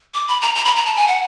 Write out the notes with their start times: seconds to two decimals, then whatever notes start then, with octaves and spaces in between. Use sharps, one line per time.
0.14 D6
0.28 B5
0.42 A#5
0.55 A#5
0.65 B5
0.76 A#5
0.86 A5
0.96 G#5
1.08 F#5